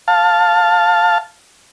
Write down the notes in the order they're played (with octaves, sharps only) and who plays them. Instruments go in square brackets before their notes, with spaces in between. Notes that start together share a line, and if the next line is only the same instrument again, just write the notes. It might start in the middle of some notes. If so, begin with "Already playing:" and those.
[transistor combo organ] F5 A5